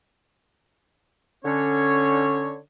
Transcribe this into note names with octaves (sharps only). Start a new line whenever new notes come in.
D3 C#4 C#5